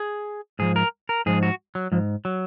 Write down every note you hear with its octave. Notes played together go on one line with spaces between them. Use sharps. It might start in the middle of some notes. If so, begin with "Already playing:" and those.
Already playing: G#4
G#2 F3 G#4
A#4
A#4
G#2 F3 G#4
F#4
F#3
G#2 F3
F#3